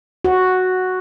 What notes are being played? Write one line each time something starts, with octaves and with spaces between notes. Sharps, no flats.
F#4